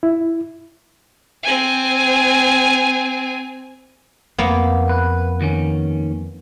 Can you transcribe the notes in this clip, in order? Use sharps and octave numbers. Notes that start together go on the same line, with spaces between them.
E4
C4 G#5
F2 A#3 B3
B4
D#2 D#3 C#4